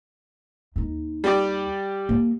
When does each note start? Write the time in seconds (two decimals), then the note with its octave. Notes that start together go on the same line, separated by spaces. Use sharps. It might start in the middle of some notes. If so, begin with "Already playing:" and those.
0.76 D#2 D#4
1.24 G3 G4 D5
2.09 A#3